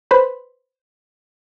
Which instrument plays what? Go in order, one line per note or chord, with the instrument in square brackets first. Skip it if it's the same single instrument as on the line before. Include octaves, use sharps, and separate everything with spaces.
[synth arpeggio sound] B4 C5 B5 C6